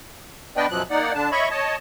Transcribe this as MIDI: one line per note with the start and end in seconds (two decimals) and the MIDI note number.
0.57 0.67 59
0.57 0.67 62
0.57 0.67 71
0.57 0.67 74
0.57 0.67 75
0.57 0.67 79
0.70 0.83 42
0.70 0.83 47
0.70 0.83 53
0.70 0.83 54
0.70 0.83 90
0.90 1.13 58
0.90 1.13 63
0.90 1.13 74
0.90 1.13 78
1.15 1.30 50
1.15 1.30 62
1.15 1.30 81
1.32 1.49 73
1.32 1.49 75
1.32 1.49 76
1.32 1.49 83
1.32 1.49 85
1.51 1.76 73
1.51 1.76 75
1.51 1.76 81